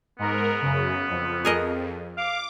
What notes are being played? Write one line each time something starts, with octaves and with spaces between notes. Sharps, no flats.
G#2 B3 A#4
F#2 C#3
F2
G#4 A#4 D#5
F5 D6